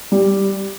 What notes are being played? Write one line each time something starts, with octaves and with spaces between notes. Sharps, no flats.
G3